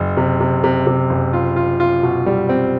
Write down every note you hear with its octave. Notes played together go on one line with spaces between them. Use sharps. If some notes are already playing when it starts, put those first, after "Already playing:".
Already playing: F#1
C3
C3
C3
C3
F#1
F4
F4
F4
B2
G3
C4